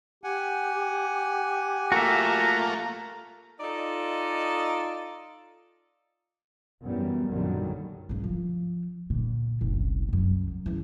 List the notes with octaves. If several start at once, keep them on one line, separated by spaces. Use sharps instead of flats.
G4 F#5 G#5
A3 A#3 F4 F#4 E5
D#4 F4 A4 D5 D#5
F#2 E3 G3 B3
A#1 F#2 D3 D#3 F#3 G3
G2 C#3
F3
A#2 D3
F#1 C2
C2 F#2
C#2 E3